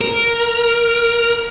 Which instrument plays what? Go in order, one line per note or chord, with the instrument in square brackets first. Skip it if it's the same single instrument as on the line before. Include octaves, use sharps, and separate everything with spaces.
[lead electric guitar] A#4